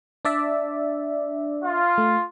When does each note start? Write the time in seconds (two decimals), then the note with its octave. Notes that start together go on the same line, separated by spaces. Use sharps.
0.25 D4 D5 E5
1.63 F4
1.98 A3